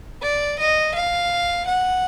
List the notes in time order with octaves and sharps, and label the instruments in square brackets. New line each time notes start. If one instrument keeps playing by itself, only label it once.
[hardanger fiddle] D5
D#5
F5
F#5